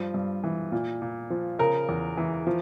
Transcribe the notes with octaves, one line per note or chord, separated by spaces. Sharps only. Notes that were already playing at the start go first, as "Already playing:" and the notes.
Already playing: G2 F3
G2
E3
A#2
A#2
F3
C#3 A#4
E2
E3
F3